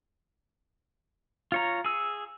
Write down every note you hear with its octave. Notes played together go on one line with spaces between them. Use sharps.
F4 C#5 A#5
G#4 E6